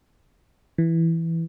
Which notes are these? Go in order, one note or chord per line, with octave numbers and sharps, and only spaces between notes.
E3